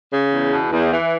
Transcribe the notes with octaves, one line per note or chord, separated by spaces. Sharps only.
C#3
E2
B2
E2
E3